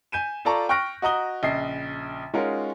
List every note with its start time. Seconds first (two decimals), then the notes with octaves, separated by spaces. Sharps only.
0.12 G#5 G6 D#7 E7
0.45 F4 A4 D5 A5 A#5 C#6
0.69 G5 C#6 F6 F#6 A#6 D7
1.02 F#4 D#5 A#5 D#6 G7
1.43 A#1 C#3 D#5 C7
2.34 G#3 C#4 D#4 F4 F#4 A#4